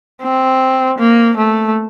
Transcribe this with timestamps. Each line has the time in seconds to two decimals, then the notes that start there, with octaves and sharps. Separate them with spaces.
0.22 C4
0.99 A#3
1.37 A3